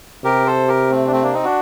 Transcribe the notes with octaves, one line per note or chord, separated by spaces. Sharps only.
C3 G4 A#4
A4 C5
G4 A#4
A3 C4
D4
A3 C4
A#3 D4
C4 D#4
D4 F#4